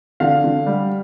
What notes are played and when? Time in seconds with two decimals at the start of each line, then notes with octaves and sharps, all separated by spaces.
0.20 D3 F5
0.44 D3
0.67 G3